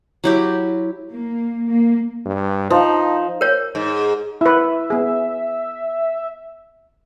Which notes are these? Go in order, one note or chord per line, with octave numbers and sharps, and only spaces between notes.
F#3 E4 G4
A#3
A#3
G2
F3 D#4
A#4 C#5
G#2
E4 B4 E5
B3 G#4